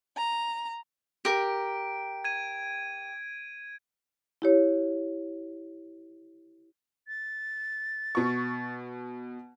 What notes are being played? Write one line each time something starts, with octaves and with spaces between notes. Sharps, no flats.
A#5
G4 A#4 D7
G#6 D#7
E4 G4 C#5
A6
B2 C#6